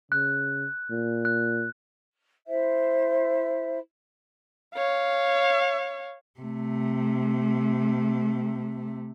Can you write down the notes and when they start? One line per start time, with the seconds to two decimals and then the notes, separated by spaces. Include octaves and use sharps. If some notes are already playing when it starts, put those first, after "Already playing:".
0.12 C#3 F#6
0.90 A#2
1.25 F#6
2.47 E4 C5 E5
4.75 C#5 F5
6.40 C3 A3